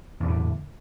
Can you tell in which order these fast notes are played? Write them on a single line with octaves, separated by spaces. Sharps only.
E2 A2 D3